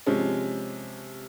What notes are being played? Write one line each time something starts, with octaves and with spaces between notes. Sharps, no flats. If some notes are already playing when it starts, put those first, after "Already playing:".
C3 F3 G#3 C#4